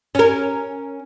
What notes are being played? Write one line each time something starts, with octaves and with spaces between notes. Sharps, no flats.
C#4 A#4